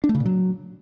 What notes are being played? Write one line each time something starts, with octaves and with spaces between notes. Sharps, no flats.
D4
A3
C#3
A#2
F#3